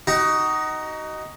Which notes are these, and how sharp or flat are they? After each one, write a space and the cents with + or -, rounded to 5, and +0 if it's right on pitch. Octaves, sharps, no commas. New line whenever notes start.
D#4 +0 F#4 +30